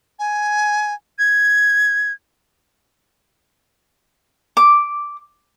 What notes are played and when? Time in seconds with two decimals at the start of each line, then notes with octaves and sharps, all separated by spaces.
0.19 G#5
1.19 G#6
4.57 D6